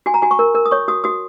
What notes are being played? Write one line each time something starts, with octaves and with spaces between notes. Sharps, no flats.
F#4 G#5
A#5
F#4 G#5
C#6
A#4
A#4
D#6
C#5 C#6
F#4 D#6
F#4 D#6